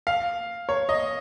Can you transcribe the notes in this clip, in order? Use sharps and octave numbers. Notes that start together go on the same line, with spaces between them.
F5
C#5
D#5